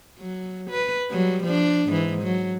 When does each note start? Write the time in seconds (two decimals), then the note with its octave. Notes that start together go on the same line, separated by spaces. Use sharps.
0.19 F#3
0.70 B4
1.10 F#3 G3
1.43 F3 D4
1.88 G#2 E3
2.22 F#3